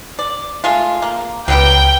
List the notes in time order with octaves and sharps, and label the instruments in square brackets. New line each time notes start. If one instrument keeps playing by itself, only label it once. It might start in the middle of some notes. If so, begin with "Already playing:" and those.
[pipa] D5
G#3 A3 F4
A#3
[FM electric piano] C#2 [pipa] F#3 G3 B3 [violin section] G5